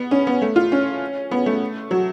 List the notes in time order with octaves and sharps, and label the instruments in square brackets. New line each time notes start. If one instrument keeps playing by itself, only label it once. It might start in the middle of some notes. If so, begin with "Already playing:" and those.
Already playing: [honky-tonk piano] B3
C#4
B3
A3
F4
C#4
B3
A3
F#3